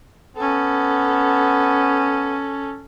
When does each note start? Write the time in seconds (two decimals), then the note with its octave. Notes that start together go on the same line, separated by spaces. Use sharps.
0.37 B3 C#4 A4